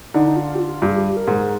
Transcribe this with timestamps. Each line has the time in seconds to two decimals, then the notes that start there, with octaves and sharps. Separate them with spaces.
0.14 D3 D#4
0.27 D#4
0.36 F4
0.55 G4
0.59 F4
0.82 G2 G4
0.89 G#4
0.97 G4
1.17 A#4
1.27 G#2